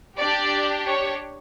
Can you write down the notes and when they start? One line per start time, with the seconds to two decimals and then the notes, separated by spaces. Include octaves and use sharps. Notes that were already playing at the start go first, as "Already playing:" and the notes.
0.18 D4 G4 D5
0.87 C#5